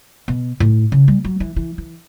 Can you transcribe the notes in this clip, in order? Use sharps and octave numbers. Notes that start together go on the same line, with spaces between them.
B2
A2
C#3
G3
F#3
E3
E3
E3